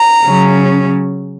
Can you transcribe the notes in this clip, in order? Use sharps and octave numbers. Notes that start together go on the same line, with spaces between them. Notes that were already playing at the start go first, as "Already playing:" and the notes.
Already playing: A#5
C#3 F#3 C#4